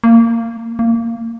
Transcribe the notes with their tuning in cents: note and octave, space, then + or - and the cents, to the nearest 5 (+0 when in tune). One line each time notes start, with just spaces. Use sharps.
A#3 -20
A#3 -20